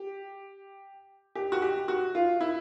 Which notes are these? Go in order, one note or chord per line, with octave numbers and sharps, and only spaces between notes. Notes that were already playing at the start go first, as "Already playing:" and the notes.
Already playing: G4
G4
F#4
G4
F#4
F4
E4